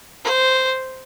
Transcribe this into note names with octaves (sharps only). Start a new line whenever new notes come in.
C5